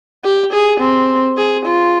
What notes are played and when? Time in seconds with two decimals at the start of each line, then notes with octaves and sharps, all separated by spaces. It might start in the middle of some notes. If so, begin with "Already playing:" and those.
0.24 G4
0.53 G#4
0.80 C4
1.37 G#4
1.66 F4